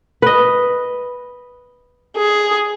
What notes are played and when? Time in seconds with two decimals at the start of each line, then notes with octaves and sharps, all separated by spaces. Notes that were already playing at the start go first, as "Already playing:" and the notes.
0.22 B4 D#5
2.17 G#4